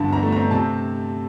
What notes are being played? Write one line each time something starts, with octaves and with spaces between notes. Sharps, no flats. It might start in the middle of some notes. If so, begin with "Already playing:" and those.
Already playing: G2 D3 A5
E2 A#5
A3
C4 A#5
C3 A5